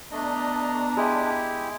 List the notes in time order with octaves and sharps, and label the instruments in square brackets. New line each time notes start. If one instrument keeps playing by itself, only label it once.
[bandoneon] A3 D#5 [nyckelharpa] B3 A#5 [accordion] D4
[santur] G#3 [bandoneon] E4 G4